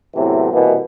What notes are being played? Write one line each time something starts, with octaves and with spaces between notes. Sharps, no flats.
E2 A2 C3 E3 F#3
C2 B2 E3 A#3 B3